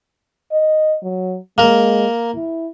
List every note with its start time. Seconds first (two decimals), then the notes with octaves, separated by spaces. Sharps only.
0.52 D#5
1.02 F#3
1.58 G#3 A#3 A#4
2.35 E4